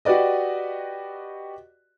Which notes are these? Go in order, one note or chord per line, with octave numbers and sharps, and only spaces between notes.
F#4 G4 B4 D5 D#5